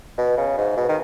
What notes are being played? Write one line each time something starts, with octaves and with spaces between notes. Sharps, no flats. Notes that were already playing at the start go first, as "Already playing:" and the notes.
B2
C#3
G#2
B2
D#3